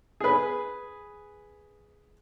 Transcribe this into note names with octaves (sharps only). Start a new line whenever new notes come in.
G#4 B4